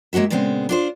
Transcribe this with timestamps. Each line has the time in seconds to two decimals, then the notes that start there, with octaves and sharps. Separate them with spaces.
0.13 G#3 A#3 C#4 F#4 E5
0.30 A#2 C#3 G#3 B3 C4
0.69 D4 F4 C5